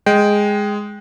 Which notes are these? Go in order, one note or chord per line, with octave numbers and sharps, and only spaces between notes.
G#3 G5